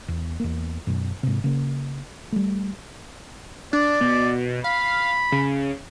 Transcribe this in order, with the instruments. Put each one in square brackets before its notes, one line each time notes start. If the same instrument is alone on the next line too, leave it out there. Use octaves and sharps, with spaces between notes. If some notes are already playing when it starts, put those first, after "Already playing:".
[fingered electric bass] E2
E2 A#3
F#2 B2
G#2 C3
C#3 A#3
G3 A3
[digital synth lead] D4 [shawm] D5
[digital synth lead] B2
[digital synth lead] F5 [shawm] B5
[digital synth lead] C#3